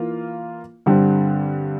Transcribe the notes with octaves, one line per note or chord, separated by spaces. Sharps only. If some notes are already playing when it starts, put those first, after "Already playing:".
Already playing: E3 A#3 F4
G2 D3 G3 C4